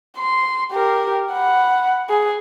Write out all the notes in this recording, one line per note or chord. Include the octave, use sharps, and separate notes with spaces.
C6
G4 A#4
F#5 B5
G#4